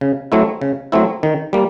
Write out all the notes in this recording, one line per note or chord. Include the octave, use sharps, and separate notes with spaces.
C#3
F#3 A3 C4 E4
C#3
F#3 A3 C4 E4
D#3
G3 A#3